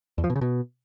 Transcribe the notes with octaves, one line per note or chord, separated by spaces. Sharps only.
E2
F3
B2
C#3
B2